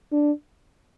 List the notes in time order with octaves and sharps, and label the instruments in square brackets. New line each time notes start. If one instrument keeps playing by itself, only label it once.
[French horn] D4